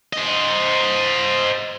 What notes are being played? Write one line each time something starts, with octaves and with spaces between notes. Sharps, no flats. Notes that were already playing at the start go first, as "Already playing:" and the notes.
C5 D#5